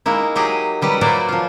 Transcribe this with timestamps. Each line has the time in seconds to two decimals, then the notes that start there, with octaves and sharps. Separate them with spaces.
0.06 G#3 A#3 D#4 E4
0.36 F#3 G4 G#4 D#5
0.82 F#3 G3 B4 F#5
1.01 A#2 F#3 A#3 B4 C5 D5
1.29 F3 F4